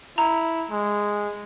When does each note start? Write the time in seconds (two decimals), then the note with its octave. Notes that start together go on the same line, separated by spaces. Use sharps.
0.18 E4 A#5
0.71 G#3